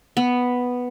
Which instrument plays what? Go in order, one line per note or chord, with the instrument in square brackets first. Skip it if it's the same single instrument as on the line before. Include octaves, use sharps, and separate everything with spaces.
[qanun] B3